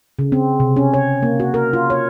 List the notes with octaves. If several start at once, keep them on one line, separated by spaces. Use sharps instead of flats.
C#3
C4
C3
C#4
C#5
A#3
F#4
A#4
F4
C#5